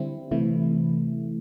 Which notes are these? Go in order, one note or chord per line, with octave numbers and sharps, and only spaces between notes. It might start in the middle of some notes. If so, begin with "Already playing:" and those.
Already playing: D3 G3 C4 E4
C3 E3 A3 E4